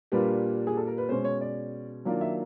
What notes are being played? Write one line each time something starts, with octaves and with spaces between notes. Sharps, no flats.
A#2 G3 A#3 D4 F4 B4
G#4
A4
A#4
B4
B2 G#3 C#4 C5
C#5
D5
D#3 F#3 A#3 D4 F4
E5